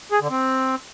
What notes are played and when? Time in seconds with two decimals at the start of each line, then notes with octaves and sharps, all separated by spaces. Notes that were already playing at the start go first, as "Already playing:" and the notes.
0.12 G#4
0.21 D3
0.30 C4